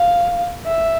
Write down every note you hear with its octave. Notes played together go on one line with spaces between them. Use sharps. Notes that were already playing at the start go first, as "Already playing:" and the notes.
Already playing: F5
E5